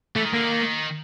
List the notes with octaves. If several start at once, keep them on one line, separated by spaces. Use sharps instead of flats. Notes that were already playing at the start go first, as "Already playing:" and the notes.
E3 A3
D#3
D3 A#3
D#3